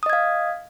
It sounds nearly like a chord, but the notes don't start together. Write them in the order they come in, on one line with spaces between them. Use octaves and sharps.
D#6 D#5 G#6 F5